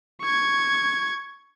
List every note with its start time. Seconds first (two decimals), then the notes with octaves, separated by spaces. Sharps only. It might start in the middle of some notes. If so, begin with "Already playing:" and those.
0.22 C#6 G#6